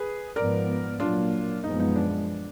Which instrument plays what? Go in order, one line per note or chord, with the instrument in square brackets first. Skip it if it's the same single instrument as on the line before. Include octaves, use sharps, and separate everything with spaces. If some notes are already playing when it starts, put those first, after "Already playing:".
Already playing: [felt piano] G#4 B4
[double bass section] G#2 F3 B3 [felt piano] A#4 D5
[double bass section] A#2 F#3 A#3 [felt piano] D4 F4
[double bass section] F#2 F3 G#3 B3 [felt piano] D#4
[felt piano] D#4
D4